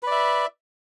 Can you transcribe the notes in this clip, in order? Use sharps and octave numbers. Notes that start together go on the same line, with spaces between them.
B4 D5 E5